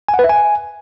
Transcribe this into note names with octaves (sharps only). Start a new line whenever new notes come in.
G#5
F#5
B4
E5
G#5